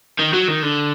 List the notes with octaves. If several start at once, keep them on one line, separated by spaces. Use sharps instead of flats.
D#3
F#3
D#3
D3